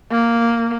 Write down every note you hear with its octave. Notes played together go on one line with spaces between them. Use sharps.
A#3